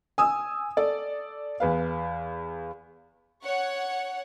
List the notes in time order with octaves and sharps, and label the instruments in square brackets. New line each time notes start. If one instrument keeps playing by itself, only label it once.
[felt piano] G#5 D#6 E6
A4 D5
E2 B4 F5
[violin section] C#5 F#5